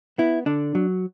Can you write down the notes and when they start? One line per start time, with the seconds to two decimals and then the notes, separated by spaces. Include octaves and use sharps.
0.18 B3 E4
0.46 D3 D4
0.75 F#3